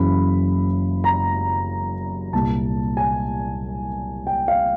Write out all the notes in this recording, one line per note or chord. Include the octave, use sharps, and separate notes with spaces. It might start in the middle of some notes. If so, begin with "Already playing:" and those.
Already playing: F#1 F#2 C#3 E3 B5
A#5
C2 A#2 A5
G#5
G5
F5